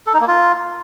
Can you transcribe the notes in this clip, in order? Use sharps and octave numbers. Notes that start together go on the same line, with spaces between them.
A4
D#4
A#3
F4